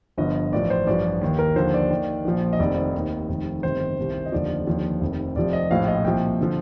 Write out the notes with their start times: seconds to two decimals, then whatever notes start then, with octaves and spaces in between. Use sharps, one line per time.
0.17 G1 G2 D3 F3 D#5
0.52 A1 A2 F3 D5
0.70 C5
0.87 A1 G2 F3 D5
1.21 D#2 D#3
1.39 A#4
1.56 D#2 D3 F3 C5
1.74 D5
1.91 D#2 D#3
2.25 A#1 A#2 F3
2.53 D#5
2.59 F1 F2 D#3 D5
2.77 D#5
2.94 D#2 D#3
3.29 F1 F2 D#3
3.63 G1 F2 C3 D#3 C5
3.98 C2 C3 D#3
4.26 D#5
4.32 F1 D#2 D3 F3 D5
4.67 D#2 D3 F3
5.01 F1 F2 D#3
5.36 F1 F2 C3 F3 D5
5.53 D#5
5.71 A#1 A2 F3 F5
5.88 D#5
6.05 C2 A#2 F3 G5
6.41 D3 F3